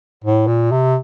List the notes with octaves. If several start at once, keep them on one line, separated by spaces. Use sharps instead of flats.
A2
A#2
C3